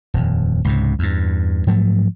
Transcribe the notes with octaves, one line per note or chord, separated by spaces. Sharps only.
D#1 F2
C#2 G#2 C3
E2 G2
G#2 F3 F#3 A3